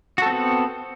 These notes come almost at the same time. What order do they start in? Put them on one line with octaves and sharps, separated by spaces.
F#4 A4 C4 B3